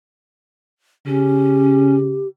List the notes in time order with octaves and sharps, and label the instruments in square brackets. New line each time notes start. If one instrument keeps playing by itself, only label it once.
[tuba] C#3 [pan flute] C#4 [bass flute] G4